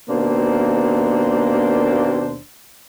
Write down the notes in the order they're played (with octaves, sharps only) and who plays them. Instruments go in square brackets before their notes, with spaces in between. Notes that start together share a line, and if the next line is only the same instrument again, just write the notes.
[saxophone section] D#2 B2 A#3 D4 C5